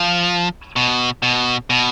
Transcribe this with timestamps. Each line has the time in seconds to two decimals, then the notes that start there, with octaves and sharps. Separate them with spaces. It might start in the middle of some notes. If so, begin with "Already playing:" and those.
Already playing: F3
0.76 B2
1.23 B2
1.70 B2